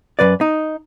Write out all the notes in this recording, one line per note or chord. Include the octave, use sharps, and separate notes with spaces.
F#2 C3 B4 D5
D#4